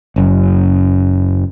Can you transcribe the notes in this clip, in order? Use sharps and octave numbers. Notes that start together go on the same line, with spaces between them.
F#1 F#2